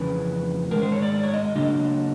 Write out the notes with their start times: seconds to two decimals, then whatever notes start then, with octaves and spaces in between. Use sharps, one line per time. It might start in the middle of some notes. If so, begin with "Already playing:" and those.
Already playing: F2 C#3 E3 B4
0.71 G#2 D#3 G#3 A#4
0.82 C5
0.92 C#5
1.02 D5
1.14 D5
1.23 C#5
1.34 D#5
1.45 D#5
1.55 C#3 F#3 A#3 D4 D#5